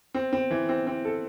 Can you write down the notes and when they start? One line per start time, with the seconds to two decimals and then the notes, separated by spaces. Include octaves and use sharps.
0.14 C4
0.33 C4
0.51 E3
0.69 C4
0.87 C4
1.05 A4